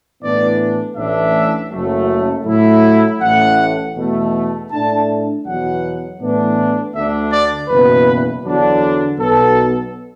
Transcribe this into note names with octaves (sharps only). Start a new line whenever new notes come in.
A2 E3 B3 D4 D5
A1 A2 E3 D4 E5
F#1 F#2 F#3 A3
A2 F#3 A3 E4
A1 A2 A3 F#5
E2 B2 A3
A2 A3 D4 A5
E2 B2 F#3 F#5
A2 E3 B3 D4
D2 D3 A3 D4 E5
D5
F#1 E2 B2 B4
E2 D3 F#3 D4
B1 B2 B3 A4